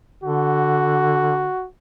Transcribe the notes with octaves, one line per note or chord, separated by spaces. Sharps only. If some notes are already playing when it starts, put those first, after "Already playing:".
D3 F#4